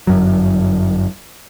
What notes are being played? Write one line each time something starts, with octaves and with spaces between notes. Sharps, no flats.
G1 F#2 F#3